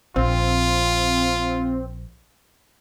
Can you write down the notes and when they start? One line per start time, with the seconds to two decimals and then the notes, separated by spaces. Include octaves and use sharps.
0.16 A#1 C4 F4